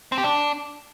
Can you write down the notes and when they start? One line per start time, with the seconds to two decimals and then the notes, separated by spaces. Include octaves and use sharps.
0.12 C4
0.18 G4
0.24 D4